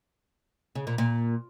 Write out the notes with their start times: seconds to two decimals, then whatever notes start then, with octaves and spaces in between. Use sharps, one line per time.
0.75 C#3
0.87 A#2
0.98 A#2